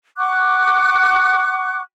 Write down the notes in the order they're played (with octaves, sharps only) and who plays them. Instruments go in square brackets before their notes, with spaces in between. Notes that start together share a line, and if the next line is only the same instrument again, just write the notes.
[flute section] F#5 C#6 D6 F#6